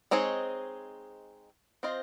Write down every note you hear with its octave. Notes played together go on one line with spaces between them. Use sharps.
G#3 C4 D#4 G#4 C#5
C4 F4 C5 D#5